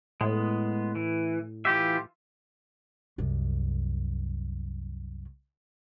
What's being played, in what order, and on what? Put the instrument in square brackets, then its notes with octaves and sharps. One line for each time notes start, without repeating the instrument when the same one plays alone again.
[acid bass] A2 [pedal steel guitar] G#3 B3
[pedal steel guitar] E3
[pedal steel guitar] E3 F4 E5 [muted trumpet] G4
[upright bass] C2 F#2